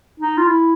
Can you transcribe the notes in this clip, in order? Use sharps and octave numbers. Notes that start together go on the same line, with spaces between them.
D#4
F4
E4